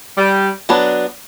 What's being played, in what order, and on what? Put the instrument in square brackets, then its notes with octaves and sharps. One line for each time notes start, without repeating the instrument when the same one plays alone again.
[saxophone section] G3
[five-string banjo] F#3 B3 D4